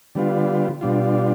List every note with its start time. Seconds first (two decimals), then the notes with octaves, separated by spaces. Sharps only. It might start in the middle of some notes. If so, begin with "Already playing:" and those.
0.15 D3 G3 B3 F4
0.81 B2 G3 D4 F4